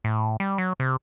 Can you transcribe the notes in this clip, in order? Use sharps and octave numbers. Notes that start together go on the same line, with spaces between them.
A2
G3
F#3
C3